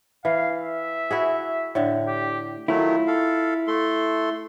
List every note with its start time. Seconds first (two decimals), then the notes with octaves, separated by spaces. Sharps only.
0.25 E3 F5
0.59 E5
1.11 E4 F#4 G#4
1.75 A2 D3
2.08 G4
2.68 D#3 F#3 A3 E4 F4
3.07 A4 F5
3.67 A3 A4 C6